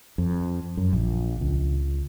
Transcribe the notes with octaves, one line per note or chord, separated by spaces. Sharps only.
F2
F#2
A#1
C#2